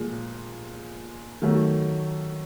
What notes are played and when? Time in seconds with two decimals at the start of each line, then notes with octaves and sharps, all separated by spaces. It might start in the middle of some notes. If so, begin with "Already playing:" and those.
Already playing: A#2 F3 G#3
1.42 D#3 F#3 A3